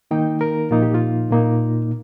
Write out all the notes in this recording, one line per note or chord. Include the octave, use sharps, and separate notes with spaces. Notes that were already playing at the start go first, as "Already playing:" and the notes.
D#3 A#3 D#4 G5
A#4
A#2 F3 A#3 D#4 F4
G4
F4
A#2 A#3 D#4